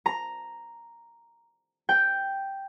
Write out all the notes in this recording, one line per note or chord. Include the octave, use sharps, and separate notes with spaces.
A#5
G5